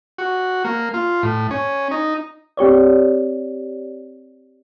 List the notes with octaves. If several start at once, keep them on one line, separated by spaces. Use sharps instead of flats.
F#4
A#3
F4
A2
C#4
D#4
C4 G4 C#5 D5